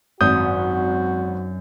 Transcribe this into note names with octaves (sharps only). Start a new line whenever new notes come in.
G#1 F#2 F#4 D#6 G6